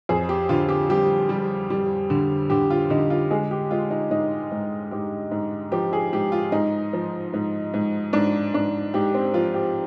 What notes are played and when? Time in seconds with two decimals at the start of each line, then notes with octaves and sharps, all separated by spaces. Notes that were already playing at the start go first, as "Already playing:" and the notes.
0.09 F2 G#4
0.29 G4
0.49 D3 F4
0.69 G4
0.89 G3 G4
1.29 G3
1.70 G3
2.10 D3
2.50 D3 G4
2.70 F4
2.90 D3 D#4
3.10 F4
3.31 G#3 G#4
3.51 G4
3.71 G#3 F4
3.90 D#4
4.11 G#2 D#4
4.51 G#2
4.91 G#2 G4
5.31 G#2
5.72 F3 G4
5.93 G#4
6.13 G#2 G4
6.32 F4
6.52 G#2 D#4
6.93 F3
7.34 G#2
7.74 G#2
8.13 G#2 D4
8.54 G#2 D4
8.94 G#2 G4
9.14 C4
9.34 F3 F4
9.54 G4